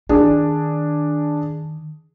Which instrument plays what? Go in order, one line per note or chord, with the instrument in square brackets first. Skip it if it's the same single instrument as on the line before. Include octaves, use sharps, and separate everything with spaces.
[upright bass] D#3 [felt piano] D4 G#4